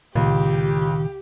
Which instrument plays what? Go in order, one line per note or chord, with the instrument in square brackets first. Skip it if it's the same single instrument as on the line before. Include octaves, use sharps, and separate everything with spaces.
[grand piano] C#2 [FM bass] A#2 [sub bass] D#3 [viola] G4